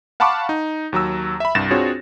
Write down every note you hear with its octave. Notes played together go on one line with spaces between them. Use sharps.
F5 F#5 A5 B5 C#6 D6
D#4
D#2 F#3 A#5 E6
E5 B5
C2 G2 A6 A#6 E7
C4 D4 F4 F#4 G#4 C#5